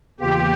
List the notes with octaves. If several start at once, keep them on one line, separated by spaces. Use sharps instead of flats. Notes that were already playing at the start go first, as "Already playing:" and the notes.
E2 C#3 E3 A#3 F4 G4